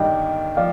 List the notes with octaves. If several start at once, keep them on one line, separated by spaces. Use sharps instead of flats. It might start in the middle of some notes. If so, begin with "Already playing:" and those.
Already playing: G1 G2 D#3 G3 D4 D#5 G5
F3 D5 F5